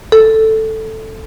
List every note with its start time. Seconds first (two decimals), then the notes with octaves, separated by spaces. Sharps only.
0.12 A4